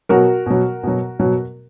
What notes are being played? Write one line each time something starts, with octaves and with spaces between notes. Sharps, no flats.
B2 F#3 F#4 A#4
B2 F#3
B2 F#3
B2 F#3